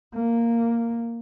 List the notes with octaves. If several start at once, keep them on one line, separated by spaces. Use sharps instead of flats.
A#3